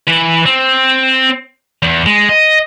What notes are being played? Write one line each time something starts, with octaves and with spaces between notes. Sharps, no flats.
E3 B4
C4
E2
G#3
D#5